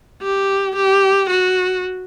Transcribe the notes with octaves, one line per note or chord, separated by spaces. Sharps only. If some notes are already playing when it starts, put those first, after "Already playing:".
G4
G4
F#4